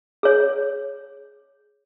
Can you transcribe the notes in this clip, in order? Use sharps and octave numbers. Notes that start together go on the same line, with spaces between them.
G#4 C#5